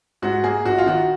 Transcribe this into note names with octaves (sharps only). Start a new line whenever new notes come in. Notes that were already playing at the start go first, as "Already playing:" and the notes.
G#2 F#4
A#3 G#4
A#1 F#4
F4
D#3 F#4